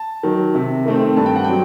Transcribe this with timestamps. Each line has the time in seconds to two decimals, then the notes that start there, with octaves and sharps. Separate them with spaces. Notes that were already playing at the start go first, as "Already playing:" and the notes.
Already playing: A5
0.23 D#3 F#3
0.55 C3
0.86 D#3 A3 C4
1.17 G2 A5
1.26 G5
1.36 F#5
1.44 F#3 C4 G5